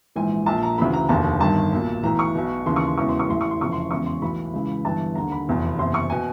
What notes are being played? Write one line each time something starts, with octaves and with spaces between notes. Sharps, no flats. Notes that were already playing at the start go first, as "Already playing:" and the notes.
A#1 G#2 E3 G#5
A#1 A#2 A5
A#5
D2 C#3 E3 B5
A#5
F1 D#2 D3 A5
G1 G2 D#3 A5
B1 A#2
B1 A2 E3 A#5
C#6
B1 B2
D#2 C#3 E3 C6
C#6
C6
E1 E2 C#3 E3 C#6
C6
C#6
A1 A2 E3 C6
C#6
C6
F1 F2 C#3 E3 C#6
C6
E1 E2 C#3 C#6
C6
B1 A2 E3 B5
C#2 C#3 E3
G1 G2 E3 A5
D#2 D3 A#5
B5
F1 E2 B2
F#1 E2 C3 C6
C#6
B2 G#5